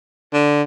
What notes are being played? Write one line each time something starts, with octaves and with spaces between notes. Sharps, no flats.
D3